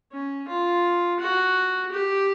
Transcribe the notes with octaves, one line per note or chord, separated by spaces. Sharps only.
C#4
F4
F#4
G4